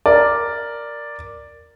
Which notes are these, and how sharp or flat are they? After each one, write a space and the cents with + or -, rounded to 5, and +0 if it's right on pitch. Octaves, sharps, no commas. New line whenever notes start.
A#4 +0 D5 +0